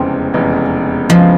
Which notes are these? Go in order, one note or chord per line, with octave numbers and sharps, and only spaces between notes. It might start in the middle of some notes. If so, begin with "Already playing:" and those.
Already playing: F1 E2 C#3 E3 G#3 C4
F1 E2 C#3 E3 G#3
C#3 E3 F3 G#3